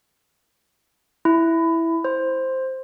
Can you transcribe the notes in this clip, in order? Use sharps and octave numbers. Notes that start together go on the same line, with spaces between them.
E4
C5